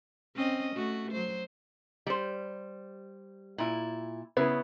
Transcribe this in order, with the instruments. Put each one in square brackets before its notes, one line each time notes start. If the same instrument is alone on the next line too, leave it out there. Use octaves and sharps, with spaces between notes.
[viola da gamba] C4 C#4 D#5
A3 F#4
F#3 C5
[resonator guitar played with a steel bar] G3 C5
A#2 E4
[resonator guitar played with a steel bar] C#3 [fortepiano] B3 E4